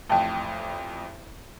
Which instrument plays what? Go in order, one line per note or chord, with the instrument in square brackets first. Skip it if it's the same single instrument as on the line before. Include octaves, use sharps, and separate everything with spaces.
[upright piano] A1 F2 [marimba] G5 A5